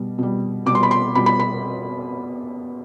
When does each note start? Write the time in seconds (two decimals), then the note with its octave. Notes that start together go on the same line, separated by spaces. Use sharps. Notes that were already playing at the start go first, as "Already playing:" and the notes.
Already playing: B2 G3
0.18 B2 G3
0.66 B2 G3 D6
0.75 C6
0.83 B5
0.91 C6
1.15 B2 G3 B5
1.26 B5
1.39 B5